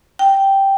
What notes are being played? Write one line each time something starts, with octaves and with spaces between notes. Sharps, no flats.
G5